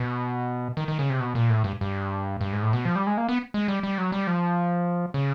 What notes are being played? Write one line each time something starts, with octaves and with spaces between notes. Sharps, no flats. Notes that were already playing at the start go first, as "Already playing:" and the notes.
Already playing: B2
D#3
D#3
C#3
C3
B2
A#2
A2
G2
G2
G2
G#2
A2
B2
F3
G3
G#3
A#3
B3
G#3
G3
G3
F#3
G3
F3
C#3